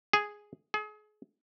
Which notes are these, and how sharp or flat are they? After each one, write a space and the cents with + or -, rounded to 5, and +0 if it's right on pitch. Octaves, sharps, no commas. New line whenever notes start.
G#4 +0
G#4 +35